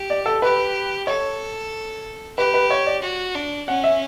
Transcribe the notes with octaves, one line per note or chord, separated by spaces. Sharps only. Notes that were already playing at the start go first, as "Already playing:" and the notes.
Already playing: G4
D5
A4
G4 B4
A4 C#5
G4 B4
B4
C#5
D5
F#4
D4
C#4 F#5
E5